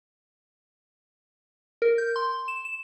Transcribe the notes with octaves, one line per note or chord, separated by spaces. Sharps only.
A#4
G6
C6
E7
E7